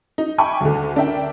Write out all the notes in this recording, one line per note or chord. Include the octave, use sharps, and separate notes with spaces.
D#4
E5 G5 G#5 B5 C#6 D6
D2 D3
D4 A#4 E5 G5